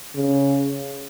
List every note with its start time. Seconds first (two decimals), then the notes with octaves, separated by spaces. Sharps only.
0.15 C#3